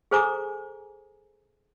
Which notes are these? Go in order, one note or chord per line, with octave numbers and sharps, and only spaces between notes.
G#4 A4 C5 G#5 A#5 D6